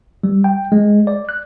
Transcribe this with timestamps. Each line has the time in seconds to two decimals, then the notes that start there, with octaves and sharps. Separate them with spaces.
0.23 G3
0.44 G5
0.72 G#3
1.07 D5
1.29 F#6